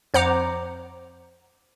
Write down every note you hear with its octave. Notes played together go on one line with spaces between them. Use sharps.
F2 C5 F#5 A#5 D6